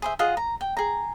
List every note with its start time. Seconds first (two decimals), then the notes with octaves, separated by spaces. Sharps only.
0.02 G#4 C5 E5
0.19 F4 G#4 D#5 F#5
0.37 A#5
0.61 G5
0.77 G#4 A#5